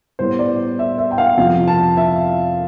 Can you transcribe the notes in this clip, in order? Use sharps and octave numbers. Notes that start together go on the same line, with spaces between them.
A2 G3 B3 C5
D5
E5
E5
G5
F5
F2 C3 F3 F5
A5
E5